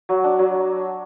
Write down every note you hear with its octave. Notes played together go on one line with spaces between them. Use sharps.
F#3
D4
F#3